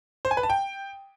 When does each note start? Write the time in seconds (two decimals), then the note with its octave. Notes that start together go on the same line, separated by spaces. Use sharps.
0.25 C5
0.31 G#5
0.37 B4
0.43 A5
0.50 G5